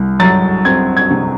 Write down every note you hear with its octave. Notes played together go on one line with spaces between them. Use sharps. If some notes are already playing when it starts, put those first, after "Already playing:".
Already playing: C2
F#3 A6
C4 G#6
G#6
C3